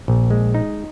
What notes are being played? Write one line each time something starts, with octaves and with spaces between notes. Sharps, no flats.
A#1
G#3
D#4